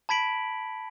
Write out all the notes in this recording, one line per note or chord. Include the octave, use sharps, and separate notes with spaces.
A5 B5 G#6 B6 D7 F#7